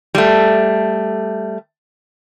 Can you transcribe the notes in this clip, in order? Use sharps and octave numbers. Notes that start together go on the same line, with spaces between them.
G3 A3